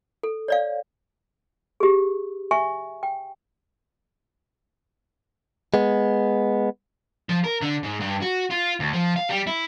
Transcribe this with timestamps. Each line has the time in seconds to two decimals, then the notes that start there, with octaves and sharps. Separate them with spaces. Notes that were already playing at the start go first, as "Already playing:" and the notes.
0.23 A4
0.48 C#5 D5 F5
1.80 G4 G#4
2.51 E5 G#5 C#6
3.03 G5
5.74 G#3 B3
7.30 F3
7.44 A#4
7.62 D3
7.83 G#2
8.00 G2
8.21 F#4
8.50 F4
8.80 D2
8.93 F3
9.16 F5
9.29 G3
9.47 E4